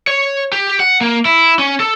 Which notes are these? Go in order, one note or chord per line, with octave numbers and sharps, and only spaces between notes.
C#5
G4
F#5
A#3
E4
C#4
A4